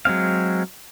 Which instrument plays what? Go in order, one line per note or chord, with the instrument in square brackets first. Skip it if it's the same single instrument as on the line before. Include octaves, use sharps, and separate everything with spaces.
[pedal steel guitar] F#3 G#3 C4 F5